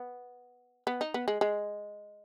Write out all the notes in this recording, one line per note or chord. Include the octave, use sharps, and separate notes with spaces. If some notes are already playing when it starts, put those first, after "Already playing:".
Already playing: B3
B3
D#4
B3
G#3
G#3